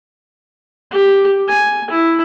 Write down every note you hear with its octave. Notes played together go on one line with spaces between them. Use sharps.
G4
G#5
E4